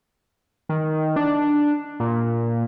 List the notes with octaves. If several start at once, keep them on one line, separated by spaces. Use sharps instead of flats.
D#3
D4
A#2